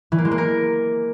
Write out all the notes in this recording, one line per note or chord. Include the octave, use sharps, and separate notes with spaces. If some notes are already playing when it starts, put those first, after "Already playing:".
E3
A#3
G#3
A#3
A#4